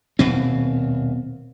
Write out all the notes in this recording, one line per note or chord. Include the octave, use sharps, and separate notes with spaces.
D#1 B2 C4